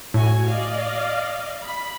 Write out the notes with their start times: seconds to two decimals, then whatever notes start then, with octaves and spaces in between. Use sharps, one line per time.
0.14 A2 F#4 C#5 G#5
0.47 D5 D#5 F5
1.64 B5